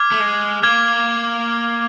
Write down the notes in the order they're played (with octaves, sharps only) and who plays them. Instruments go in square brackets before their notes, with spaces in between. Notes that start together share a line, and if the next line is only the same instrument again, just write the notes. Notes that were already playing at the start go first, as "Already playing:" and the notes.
Already playing: [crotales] D6 F6 G#6
[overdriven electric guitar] A3
G#3
[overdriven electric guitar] A#3 [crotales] D6 F6 G#6